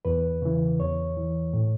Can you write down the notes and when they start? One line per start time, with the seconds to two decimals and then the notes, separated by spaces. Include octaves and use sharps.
0.05 E2 B4
0.42 C#3 E3
0.79 E2 C#5
1.17 E3
1.53 A2